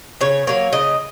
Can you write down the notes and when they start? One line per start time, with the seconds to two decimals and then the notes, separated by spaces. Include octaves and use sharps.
0.21 C#3 C#5
0.47 F#3 A#3 C#5
0.73 C#3 D#5